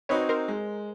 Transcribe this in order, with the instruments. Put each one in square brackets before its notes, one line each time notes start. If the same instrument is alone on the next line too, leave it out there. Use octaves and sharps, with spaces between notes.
[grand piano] C4 D#4 F#4 [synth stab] B4 C#5
[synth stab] A#4 C5
[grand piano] G#3